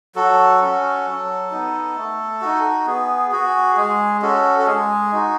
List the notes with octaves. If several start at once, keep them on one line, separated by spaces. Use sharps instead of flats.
F#3 F#4 A4
C#4 F#4
F#3
B3 D#4
A3
D#4 F#4
B3 G#4
F#4 G#4
G#3 G#4
C#4 F#4 A4
A4
G#3 G#4
D#4 F#4